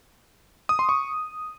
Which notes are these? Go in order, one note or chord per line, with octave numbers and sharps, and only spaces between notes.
D#6
C6
C#6